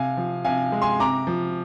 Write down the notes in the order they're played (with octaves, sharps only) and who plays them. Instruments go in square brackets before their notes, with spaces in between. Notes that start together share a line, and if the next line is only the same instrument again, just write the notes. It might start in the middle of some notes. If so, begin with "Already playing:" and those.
Already playing: [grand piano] C3 F5 G#5
F3
C3 F5 G#5
G#3
G#5 C6
C3 A#5 D6
F3